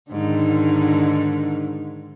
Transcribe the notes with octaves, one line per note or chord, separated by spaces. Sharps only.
G#2 D3 D#3